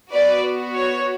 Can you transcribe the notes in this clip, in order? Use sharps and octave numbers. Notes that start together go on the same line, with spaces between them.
B3 F#4 B4 D5
C#5